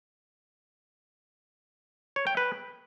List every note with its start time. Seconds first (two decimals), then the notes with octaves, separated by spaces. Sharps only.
2.16 C#5
2.27 G5
2.37 B4